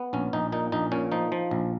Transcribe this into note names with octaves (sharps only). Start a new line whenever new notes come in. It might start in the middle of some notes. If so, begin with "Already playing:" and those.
Already playing: B3
A#1 C#4
A#1 D#4
A#2 D#4
A#1 D#4
A#2 C#4
F3 D#4
F3
A#1